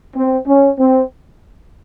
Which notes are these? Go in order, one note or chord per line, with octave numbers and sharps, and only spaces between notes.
C4
C#4
C4